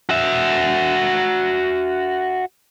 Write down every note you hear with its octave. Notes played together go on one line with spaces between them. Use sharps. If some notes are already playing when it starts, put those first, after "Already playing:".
F#4 E5